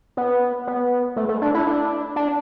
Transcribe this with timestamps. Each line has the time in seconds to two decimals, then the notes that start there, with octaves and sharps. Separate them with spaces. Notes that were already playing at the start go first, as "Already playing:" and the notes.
0.17 B3
0.67 B3
1.16 A3
1.29 A3
1.42 D4
1.54 E4
1.67 D4
2.16 D4